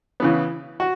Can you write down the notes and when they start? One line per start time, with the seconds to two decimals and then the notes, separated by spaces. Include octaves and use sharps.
0.20 C#3 E3 B3
0.80 F#4